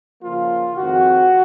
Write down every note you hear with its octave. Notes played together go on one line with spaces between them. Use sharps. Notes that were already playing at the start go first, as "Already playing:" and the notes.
C#3 F3 A#3 F4
F2 D#3 G#3 C4 F#4